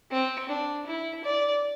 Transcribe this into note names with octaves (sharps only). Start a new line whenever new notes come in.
C4
D4
E4
D5